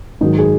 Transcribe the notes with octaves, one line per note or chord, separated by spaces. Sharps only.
G#2 D#3 F#3 D#4
G#4